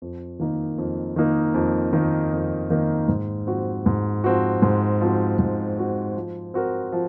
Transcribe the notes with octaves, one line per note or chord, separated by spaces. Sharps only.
F2
D#3 A#3 D#4
F2
D#3 A#3 D#4
F2
D#3 A#3 D#4
F2
D#3 A#3 D#4
G#2
F3 C4 F#4
G#2
F3 C4 F#4
G#2
F3 C4 F#4
G#2
F3 C4 F#4
F3
C4 F#4 A#4
F3